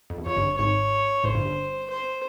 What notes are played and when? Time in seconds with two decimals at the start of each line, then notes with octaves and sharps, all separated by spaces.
0.10 F2
0.18 E2
0.26 F2 C#5
0.37 G1 G2
0.58 G#1 G#2 C#5
1.24 A1 A2 C5
1.35 G1 G2
1.45 G1 G2
1.89 C5